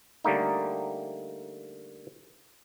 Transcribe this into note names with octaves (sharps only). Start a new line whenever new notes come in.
D3 G3 A3 A#3 D#4